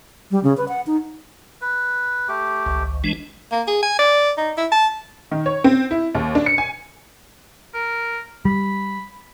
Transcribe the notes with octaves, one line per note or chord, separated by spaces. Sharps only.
G3
C#3
B4
F#5
D#4
B4
A3 G4
G#1 C#2
E3 G#3 D4
A#3
G#4
G#5
D5
D#4
E4
A5
D#3
C#5
C4
E4
D#2
D4
C#7
G#5
A#4
G3 B5